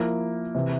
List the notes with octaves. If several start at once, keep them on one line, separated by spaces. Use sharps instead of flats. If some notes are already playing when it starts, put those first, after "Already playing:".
Already playing: F3 A#3 E4
C3 E3